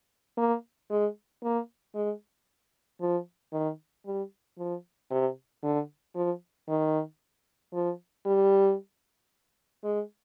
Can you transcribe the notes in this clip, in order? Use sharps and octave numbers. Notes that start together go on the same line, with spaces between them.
A#3
G#3
A#3
G#3
F3
D#3
G3
F3
C3
D3
F3
D#3
F3
G3
G#3